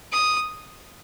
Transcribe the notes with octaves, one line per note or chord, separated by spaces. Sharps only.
D#6